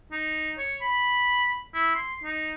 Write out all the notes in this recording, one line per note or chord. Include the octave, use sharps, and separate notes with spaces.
D#4
C#5
B5
E4
C6
D#4